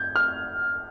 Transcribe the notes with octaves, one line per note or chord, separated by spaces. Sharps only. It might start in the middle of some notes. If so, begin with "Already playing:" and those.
Already playing: G6 G#6
F6